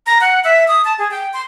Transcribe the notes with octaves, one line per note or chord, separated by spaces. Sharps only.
A#5
F#5
E5
D#6
A5
G#4
G5
C6